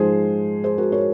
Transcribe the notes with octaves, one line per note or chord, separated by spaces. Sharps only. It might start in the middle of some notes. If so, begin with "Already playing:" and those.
Already playing: G#2 F3 G#3 G#4 C5
G#4 C5
F#4 A#4
A#4 C#5